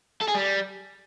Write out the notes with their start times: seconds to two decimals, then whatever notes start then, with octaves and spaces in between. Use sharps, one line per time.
0.21 A4
0.28 G#4
0.35 G3